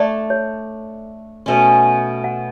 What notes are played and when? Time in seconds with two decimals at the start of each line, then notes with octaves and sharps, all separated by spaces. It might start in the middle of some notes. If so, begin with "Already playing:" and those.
Already playing: A3 D4 A4 D5
0.30 C#5
1.46 B2 A3 C#4
2.24 F#5